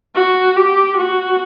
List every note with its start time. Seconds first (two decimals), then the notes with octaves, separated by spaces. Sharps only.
0.15 F#4
0.56 G4
0.98 F#4